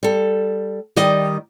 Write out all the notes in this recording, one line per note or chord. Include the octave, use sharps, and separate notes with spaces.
G3 A4
D#3 G3 D5 D#5